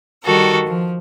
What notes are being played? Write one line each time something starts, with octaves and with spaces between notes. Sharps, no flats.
D#3 G3 F#4 A4 A#4
F3